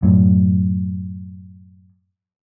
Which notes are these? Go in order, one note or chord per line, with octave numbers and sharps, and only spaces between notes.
F#2 A2